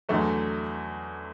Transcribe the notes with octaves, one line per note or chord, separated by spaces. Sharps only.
E2 D3 F#3 A3